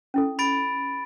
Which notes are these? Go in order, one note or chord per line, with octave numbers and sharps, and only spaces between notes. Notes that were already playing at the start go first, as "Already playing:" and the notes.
C#4 E4 A4
B5 A6 D7